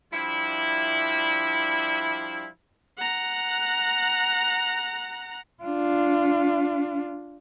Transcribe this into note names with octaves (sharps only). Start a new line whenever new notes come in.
F3 G3 D4 E4
F#5 A#5
D4 F4